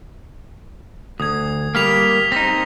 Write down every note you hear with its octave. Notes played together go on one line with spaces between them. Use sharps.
D2 D#6 G#6
G3 A#3 F6 B6 F7
C4 D#4 A#6